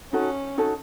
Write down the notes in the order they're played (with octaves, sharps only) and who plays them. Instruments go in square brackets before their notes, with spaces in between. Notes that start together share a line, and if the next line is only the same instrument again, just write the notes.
[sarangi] C#4 [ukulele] D#4 F#4 A4
[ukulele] D#4 F#4 A4